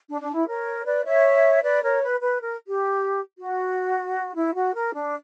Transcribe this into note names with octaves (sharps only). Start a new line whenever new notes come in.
D4
D4
E4
A#4 C#5
B4 D5
C#5 E5
B4 D5
A#4 C#5
B4
B4
A#4
G4
F#4
E4
F#4
A#4
D4